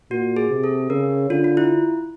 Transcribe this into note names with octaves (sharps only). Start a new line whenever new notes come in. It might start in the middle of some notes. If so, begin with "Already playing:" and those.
A#2 F#4
G#4
C3
A4
C#3 A#4
D3 F4
F4
E4